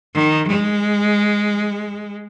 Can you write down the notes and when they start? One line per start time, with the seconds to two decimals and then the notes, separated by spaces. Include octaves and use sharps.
0.15 D#3
0.48 G#3